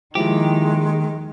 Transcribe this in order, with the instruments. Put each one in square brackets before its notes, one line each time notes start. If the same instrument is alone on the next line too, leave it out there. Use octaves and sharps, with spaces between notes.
[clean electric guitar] D#2 G4 [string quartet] D#3 [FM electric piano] F3 E4 [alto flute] G#3